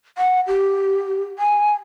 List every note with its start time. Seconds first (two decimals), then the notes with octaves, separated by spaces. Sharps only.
0.18 F#5
0.47 G4
1.39 G#5